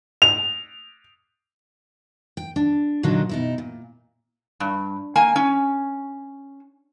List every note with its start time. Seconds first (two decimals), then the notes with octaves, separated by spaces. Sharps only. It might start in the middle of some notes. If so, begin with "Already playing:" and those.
0.22 F7
2.37 G5
2.56 D4
3.03 A#2 D3 F#3 D4 D#4
3.29 B2 D#4 E4
3.58 A#2
4.60 G2
5.16 A#3 G#5
5.36 C#4